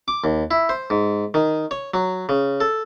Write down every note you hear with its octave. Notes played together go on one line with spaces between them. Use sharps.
D6
D#2
E4
C5
G#2
D#3
C#5
F#3
C#3
A4